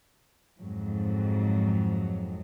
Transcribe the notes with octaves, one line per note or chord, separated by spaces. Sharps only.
F2 G#2 F#3